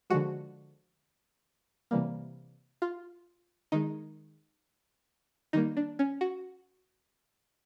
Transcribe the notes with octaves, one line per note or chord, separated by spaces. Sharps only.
D3 F3 G#3 F#4
C3 E3 G3 A#3
F4
D#3 G#3 D#4
D#3 G3 A#3 D#4
D4
C#4
F#4